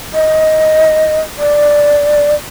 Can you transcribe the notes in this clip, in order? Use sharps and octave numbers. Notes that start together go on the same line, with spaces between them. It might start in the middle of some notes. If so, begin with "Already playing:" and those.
D#5
D5